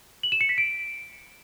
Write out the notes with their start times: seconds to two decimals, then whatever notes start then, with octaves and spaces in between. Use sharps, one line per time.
0.23 F#7
0.32 E7
0.41 C#7
0.49 B6
0.58 D7